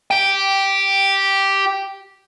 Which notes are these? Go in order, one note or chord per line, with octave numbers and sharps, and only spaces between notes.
G4 G5